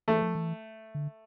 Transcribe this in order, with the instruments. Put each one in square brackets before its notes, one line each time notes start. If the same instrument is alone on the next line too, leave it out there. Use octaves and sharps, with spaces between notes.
[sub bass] E3 [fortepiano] A3
[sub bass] F3
E3
D3